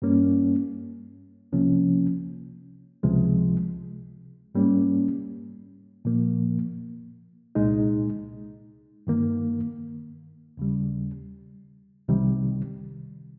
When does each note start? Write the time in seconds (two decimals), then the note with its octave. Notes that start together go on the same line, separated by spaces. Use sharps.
0.02 G2 G3 A#3 C#4
1.52 C2 C3 F3 A#3 C#4
3.03 C#2 C3 F3 G#3
4.55 G#2 G3 A#3 C#4
6.05 A#2 F3 A#3
7.55 C2 A#2 G#3 D#4
9.07 G2 D#3 A#3
10.57 D#2 C#3 G3
12.08 C2 C3 D#3 G3